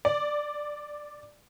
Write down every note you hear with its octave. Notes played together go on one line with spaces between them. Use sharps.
D5